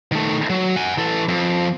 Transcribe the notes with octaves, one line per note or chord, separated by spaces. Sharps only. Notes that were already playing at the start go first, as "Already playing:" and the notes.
D#3 A3
F#3
F#5 G#5
E3 A4
F2